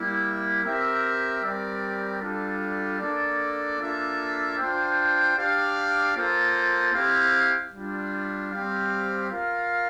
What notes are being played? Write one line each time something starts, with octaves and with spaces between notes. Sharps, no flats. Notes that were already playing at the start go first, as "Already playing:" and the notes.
Already playing: G3 A#3 E4
C4 G4 A#4 E5
G3 C4 G4 A#4 D5
G3 D4 F4 A4
A#3 D4 A4 D5
A#3 D4 F4 A4 E5
D4 F4 C5 G5
D4 G4 D5 F5
A#3 F4 A4 C5
C4 E4 G4 C5 F5
G3 D4 F4
G3 C4 G4 C5 F5
F4 A#4 F5